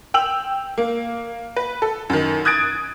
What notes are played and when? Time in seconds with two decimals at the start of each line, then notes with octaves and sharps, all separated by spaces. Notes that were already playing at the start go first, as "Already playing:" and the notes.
0.14 G5 E6 F7 F#7
0.77 A#3
1.56 B4
1.82 A4
2.10 F#2 D#3
2.45 D#6 F#6 G#6 A6 D7